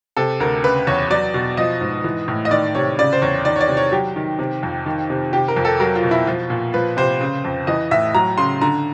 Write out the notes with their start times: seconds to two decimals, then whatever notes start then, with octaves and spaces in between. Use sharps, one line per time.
0.17 C3 A4
0.40 D2 A#4
0.63 C#3 B4
0.87 E2 C#5
1.10 F#3 D5
1.34 B2
1.57 F3 D#5
1.81 G#2
2.04 E3
2.28 A2
2.45 D#5
2.51 D#3 D5
2.75 C3 C#5
2.98 C#3 D5
3.13 C5
3.22 E2 C#5
3.45 D#3 D5
3.56 C#5
3.61 D5
3.68 C3
3.77 C#5
3.92 F#3 G4
4.16 D#3
4.39 C3
4.63 F2
4.86 D#3
5.10 C3
5.33 C3 G4
5.48 A#4
5.57 F2
5.65 A4
5.80 F#3 A#4
5.95 F4
6.03 B2
6.11 E4
6.27 F3 F4
6.50 A#2
6.74 F3 B4
6.97 C3 C5
7.21 C#3
7.45 F2
7.67 E3 D#5
7.91 A2 E5
8.15 F#3 A#5
8.38 C#3 C6
8.61 D3 A#5